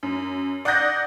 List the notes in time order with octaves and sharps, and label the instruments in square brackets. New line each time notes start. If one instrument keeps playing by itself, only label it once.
[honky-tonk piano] F#2
D5 F#5 D#6 F#6 G6 A#6